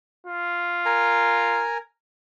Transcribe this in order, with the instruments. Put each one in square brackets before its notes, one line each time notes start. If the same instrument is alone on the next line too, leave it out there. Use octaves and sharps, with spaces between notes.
[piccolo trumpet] F4
[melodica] A#4 G#5 A#5